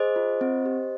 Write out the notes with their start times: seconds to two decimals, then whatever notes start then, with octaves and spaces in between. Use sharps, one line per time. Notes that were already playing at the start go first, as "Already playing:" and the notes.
Already playing: G#4 C5 D#5
0.16 F4
0.41 C4
0.66 G4